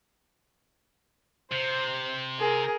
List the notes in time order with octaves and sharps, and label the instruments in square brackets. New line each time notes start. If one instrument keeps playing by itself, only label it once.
[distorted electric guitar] C3 [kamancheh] C5
[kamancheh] G#4 A#4